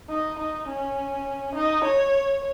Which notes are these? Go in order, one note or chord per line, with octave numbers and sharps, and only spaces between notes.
D#4
D#4
C#4
D#4
C#5